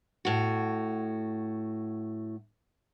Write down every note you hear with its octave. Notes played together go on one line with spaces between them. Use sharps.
A2 F#4